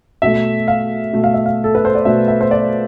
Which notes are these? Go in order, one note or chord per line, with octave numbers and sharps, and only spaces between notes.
B2 A3 E5
F5
B2 A3
F5
E5
F5
A4
B4
C5
D5
B2 A3 E5
E5
C5
D5